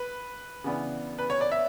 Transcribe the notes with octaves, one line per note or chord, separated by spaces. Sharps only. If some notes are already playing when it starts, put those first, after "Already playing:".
Already playing: B4
C#3 E3 B3 D4
B4
C#5
D5
E5